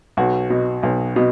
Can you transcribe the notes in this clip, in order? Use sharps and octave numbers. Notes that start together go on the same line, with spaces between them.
B1 F#4
B2
B1
B2